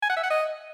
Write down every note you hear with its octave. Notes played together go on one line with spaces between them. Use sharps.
G#5
F#5
E5
F#5
D#5